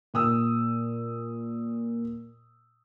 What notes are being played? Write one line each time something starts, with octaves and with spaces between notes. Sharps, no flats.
A#2 D#6 E6